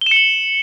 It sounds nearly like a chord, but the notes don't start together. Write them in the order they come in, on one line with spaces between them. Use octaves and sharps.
G7 E7 C#7 F#7